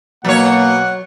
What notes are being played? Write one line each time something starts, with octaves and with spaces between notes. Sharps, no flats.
B2 F#3 A#3 C#5 F#5